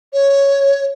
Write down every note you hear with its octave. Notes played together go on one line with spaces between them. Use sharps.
C#5